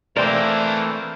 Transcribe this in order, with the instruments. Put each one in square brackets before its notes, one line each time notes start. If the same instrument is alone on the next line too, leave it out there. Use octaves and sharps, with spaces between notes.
[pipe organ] E3 A3 [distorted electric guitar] A#3 D4 [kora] C4 D5 [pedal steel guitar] A#4 C5